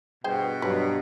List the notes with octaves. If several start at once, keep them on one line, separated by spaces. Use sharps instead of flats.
G2 B2 G#4 C5 G5
G2 F#3 B4